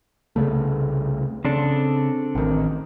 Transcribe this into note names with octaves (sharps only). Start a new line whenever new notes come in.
C2 C#3 A3
C#3 C4 D4 A4
A1 D#3